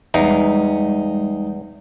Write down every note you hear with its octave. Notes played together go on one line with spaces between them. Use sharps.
E2 G3 G#3 D#4